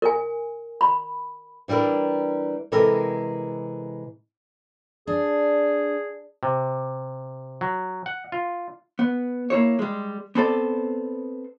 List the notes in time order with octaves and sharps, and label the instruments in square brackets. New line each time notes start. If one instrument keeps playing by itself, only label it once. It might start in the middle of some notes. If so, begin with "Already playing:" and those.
[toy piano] A#4 G#5
B5
[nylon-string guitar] E3 G3 D4 E4 A#4
C3 E3 G#3 A4 A#4
[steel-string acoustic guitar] D4 [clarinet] G#4
[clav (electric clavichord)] C3
F#3
F#5
F4
[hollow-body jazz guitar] B3
A#3 E4 C#5
G3 G#3
B3 C4 A4 D5